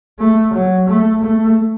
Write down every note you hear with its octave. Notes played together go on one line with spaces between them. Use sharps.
A3
F#3
A3
A3